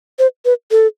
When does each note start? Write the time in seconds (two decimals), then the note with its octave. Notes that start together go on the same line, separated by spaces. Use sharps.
0.19 C5
0.45 B4
0.71 A4